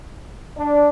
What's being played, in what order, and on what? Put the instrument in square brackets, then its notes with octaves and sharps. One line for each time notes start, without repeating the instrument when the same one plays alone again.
[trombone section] D4